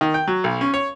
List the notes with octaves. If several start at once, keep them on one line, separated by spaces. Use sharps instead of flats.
D#3
G5
F#3
B1
C#4
C#5